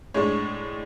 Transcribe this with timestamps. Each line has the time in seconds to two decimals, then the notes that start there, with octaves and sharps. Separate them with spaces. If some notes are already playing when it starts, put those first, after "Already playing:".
0.14 A2 G#3 D4 C#5